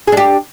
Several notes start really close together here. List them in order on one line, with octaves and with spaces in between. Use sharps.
G#4 D4 G4